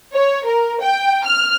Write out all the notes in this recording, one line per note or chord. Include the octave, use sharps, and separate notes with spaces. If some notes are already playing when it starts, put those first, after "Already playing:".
C#5
A#4
G5
F6